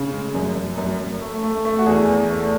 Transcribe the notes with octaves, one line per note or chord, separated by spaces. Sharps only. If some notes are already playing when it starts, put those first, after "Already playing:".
Already playing: C#3
G#3
F#2
F#2
F#2
F#2
A3
A3
A3
F#4
E2 G#4
E2
A3